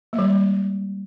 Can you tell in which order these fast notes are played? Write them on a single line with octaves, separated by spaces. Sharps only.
A#3 G#3 G3